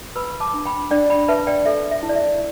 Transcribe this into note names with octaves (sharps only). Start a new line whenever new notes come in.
B4 B5 E6
A5 D6
D4
G5 B5
D4 D5 G5
G5 B5
B4 E5 A5
D5 G5
A4 E5
E5
E4
D5
E5